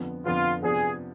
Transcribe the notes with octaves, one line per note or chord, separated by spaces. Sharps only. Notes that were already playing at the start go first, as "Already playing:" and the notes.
Already playing: F2 D3 F3 B3
F2 D3 F3 B3 F4
C3 F3 B3 D4 G#4